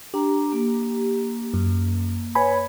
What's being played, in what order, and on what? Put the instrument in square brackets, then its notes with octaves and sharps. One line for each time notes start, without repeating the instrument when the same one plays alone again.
[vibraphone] D4 A#5 [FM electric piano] G4
[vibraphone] A#3
[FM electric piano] F#2
[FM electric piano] B4 G#5 B5 [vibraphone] C#5